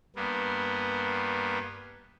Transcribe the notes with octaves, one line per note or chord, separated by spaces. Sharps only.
G2 A#3 B3